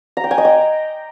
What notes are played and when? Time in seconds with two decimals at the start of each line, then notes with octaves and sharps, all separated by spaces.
0.17 A#5
0.24 G5
0.31 G#5
0.38 D#5
0.45 G5